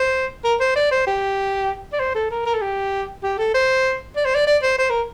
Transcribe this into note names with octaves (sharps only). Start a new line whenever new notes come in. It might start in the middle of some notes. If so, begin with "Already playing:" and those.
Already playing: C5
A#4
C5
D5
C5
G4
D5
C5
A4
A#4
A#4
A4
G4
G4
A4
C5
D5
C5
D5
D5
C5
C5
A#4